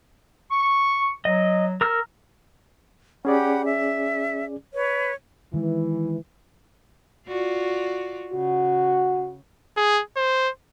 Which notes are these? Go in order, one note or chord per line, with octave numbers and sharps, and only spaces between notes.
C#6
F#3 D#5
A#4 E6 F6
C#4 G4 G#4 D5 F#5 B5
E5
B4 C#5
D#3 E3 G#3
F4 F#4 D5
C#3 F#4
G#4
C5